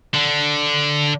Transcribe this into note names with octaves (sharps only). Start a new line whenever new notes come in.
D3